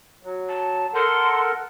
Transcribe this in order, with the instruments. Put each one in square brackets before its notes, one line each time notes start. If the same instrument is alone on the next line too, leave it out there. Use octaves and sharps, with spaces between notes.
[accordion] F#3
[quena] A5
[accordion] A4 A#4 F#5 [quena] C6